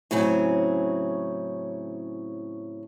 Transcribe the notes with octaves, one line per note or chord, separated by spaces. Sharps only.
A2 C#3 F#3 C4 G#4